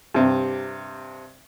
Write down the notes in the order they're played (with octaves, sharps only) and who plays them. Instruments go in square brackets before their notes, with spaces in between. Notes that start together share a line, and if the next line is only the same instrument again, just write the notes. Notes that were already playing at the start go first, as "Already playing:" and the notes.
[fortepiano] G2 C3